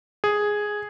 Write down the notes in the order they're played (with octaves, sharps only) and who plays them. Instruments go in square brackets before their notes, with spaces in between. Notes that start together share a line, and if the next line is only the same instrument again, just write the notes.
[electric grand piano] G#4